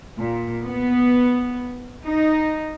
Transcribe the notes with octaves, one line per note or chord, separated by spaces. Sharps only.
A#2
B3
D#4